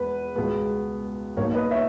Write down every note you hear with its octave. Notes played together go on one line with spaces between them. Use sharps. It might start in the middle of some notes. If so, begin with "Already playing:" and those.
Already playing: E1 E2 B4
C#2 B2 G#3 B3
B1 B2 A#3 D#4 A#4 C#5
B4 D#5
C#5 E5